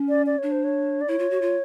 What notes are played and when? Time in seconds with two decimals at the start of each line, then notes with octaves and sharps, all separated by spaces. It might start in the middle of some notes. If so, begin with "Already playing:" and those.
Already playing: C#4
0.09 D5
0.26 D5
0.38 D4 C#5
0.52 C5
0.64 C#5
1.01 D5
1.08 E4 C#5
1.19 F4
1.31 F#4
1.42 F4